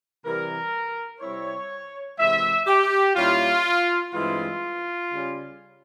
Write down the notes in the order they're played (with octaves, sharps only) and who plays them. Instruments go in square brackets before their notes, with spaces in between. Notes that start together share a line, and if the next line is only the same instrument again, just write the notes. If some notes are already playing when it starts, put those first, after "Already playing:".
[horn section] C3 E3 G3 A#4
C3 G3 C4 E4 C#5
C3 E3 G#3 E5
G4
A#2 G3 C#4 E4 F4
G2 E3 G#3 C4 E4 F4
C#3 G3 C#4